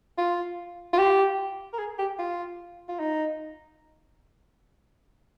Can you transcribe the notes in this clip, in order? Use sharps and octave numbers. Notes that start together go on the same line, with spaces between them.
F4
F4
G4
A#4
G#4
G4
F4
F4
D#4